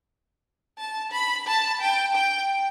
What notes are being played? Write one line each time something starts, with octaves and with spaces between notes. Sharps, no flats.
A5
B5
A5
G5
G5